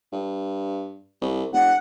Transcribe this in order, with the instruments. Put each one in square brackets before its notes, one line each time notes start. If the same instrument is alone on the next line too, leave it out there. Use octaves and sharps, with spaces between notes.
[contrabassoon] G2
C2
[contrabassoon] F1 [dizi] F#5